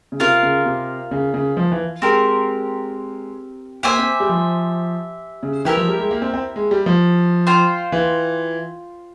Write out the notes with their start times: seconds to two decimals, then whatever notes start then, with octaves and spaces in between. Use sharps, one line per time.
0.12 C#3
0.20 C3 F4 A#4 F5
0.43 C#3
0.66 C3
1.11 C#3
1.34 C#3
1.57 F3
1.72 E3
2.02 G#3 C4 G4 A#4
3.83 A#3 G4 C5 E5 G#5
3.99 C4
4.20 G3
4.29 F3
5.43 C#3
5.65 E3 E4 G4 A#4 E5
5.77 F3
5.88 G3
5.99 G#3
6.11 A#3
6.22 C4
6.34 C4
6.56 G#3
6.71 G3
6.86 F3
7.47 F4 C5 G5
7.92 E3